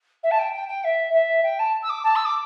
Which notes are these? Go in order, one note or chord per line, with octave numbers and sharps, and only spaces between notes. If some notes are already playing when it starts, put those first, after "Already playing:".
E5
A5
G5
G5
G5
E5
E5
G5
A5
E6
D6
A5
E6
D6